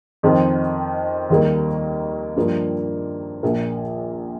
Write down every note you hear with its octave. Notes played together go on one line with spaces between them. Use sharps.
F2 D#3 C4
D#2 D#3 G3 A#3
G2 F3 A#3
A#1 A#2 A#3